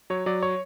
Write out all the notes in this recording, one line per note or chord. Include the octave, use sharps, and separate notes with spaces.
F#3 C#5
F#3 D5
C#5